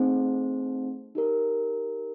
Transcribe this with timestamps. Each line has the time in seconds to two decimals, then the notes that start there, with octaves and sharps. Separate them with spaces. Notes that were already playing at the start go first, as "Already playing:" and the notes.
Already playing: A3 C4 D#4 G#4 C5
1.15 D#4 G4 A#4